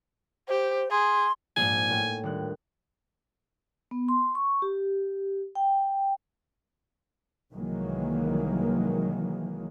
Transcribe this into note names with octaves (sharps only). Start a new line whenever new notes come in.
G4 C5
G#4 C6
A#1 G#2 G#5
A2
D#1 D4 F#6
B3
C6
C#6
G4
G5
C2 D#3 E3 F#3 G#3 A#3